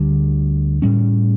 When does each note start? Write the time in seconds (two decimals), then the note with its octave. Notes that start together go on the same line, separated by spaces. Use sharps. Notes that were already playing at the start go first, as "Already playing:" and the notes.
Already playing: D2 D3 G3
0.82 A2 G3 C#4